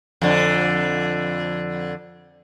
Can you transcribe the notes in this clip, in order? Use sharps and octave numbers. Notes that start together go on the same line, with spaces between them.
F2 D3